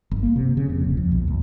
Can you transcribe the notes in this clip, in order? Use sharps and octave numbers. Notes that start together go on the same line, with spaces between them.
G1
A#3
C3
C#3
F2
D#1
F2
B1
D2